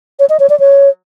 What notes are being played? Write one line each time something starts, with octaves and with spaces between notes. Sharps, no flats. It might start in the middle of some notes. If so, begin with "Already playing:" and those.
C#5
D#5
C#5
D5
C#5